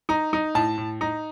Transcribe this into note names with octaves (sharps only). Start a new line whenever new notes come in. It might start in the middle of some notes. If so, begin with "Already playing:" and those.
D#4 A#5
D#4
A2 A5
A2
D#4 A#5